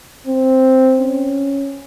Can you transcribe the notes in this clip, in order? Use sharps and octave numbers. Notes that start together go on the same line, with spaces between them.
C4
C#4